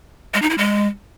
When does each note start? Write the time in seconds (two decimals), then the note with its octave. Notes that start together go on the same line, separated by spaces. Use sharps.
0.34 G#3
0.42 D#4
0.50 E4
0.58 G#3